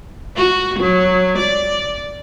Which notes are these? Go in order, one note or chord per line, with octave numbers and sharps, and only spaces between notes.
F#4
F#3
D5